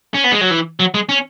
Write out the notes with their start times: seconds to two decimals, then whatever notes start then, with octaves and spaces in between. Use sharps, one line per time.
0.14 C#4
0.24 B3
0.32 G#3
0.41 F#3
0.51 E3
0.80 F#3
0.94 G#3
1.09 C#4